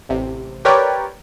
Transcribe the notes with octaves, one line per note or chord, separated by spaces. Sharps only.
A1 C3
G4 A#4 B4 C#5 D5 G5